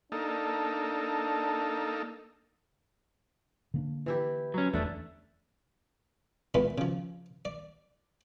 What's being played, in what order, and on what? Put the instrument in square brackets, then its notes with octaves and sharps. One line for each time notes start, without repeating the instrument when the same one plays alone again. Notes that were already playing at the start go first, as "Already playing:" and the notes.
[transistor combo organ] A#3 D#4 A4 [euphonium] D4
[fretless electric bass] D3 A#3 D4
[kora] E3 E4 G4
[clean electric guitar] F#3 C#4
[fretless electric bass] F1 E2 [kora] D3 A4 E5 [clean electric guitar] A3 D4
[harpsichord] A#2 E3 G#3 B3
C#3 F3
D5